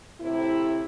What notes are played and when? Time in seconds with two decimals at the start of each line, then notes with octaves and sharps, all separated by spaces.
0.21 A2 C3 E4